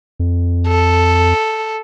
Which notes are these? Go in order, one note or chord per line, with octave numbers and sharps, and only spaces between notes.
F2
A4